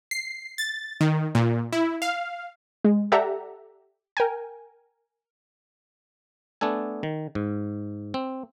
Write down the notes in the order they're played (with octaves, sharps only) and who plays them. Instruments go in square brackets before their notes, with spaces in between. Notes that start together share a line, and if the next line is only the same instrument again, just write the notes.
[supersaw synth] C7
A6
D#3
A#2
E4
F5
[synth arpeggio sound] G#3
G4 A4 D5 E5 F#5 A#5
A#4 G5 G#5
[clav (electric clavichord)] A3 B3 D4 A4 G#5
D#3
G#2
C4